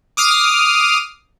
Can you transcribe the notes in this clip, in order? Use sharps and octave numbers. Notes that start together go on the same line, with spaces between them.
D6 D#6 F6 C7